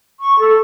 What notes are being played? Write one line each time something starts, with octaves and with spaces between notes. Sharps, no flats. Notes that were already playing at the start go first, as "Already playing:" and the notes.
C#6
A4